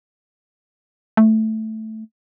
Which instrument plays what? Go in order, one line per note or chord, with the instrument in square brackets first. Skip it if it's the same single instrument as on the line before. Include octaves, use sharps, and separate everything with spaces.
[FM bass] A3